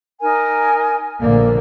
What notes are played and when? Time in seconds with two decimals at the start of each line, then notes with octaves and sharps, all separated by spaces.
0.21 D#4 A#4 G#5
1.21 A#1 D3 A#3 D5